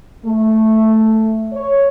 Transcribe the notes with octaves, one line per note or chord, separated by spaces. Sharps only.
A3
C#5